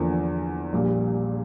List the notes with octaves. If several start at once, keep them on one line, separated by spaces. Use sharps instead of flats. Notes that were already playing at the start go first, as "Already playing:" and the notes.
Already playing: E2 D3 F3 A#3 D4
A#1 A#2 G3